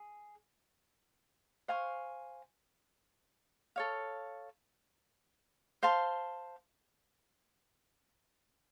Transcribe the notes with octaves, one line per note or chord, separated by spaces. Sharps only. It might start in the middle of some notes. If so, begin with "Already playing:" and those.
Already playing: G#4
C5 F5 G#5 C#6
A4 C#5 F5
C5 F5 A5 C6